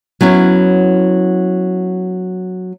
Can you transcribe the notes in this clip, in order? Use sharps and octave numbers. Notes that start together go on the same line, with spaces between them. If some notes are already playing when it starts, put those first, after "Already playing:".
F#3 B3 C#4 E4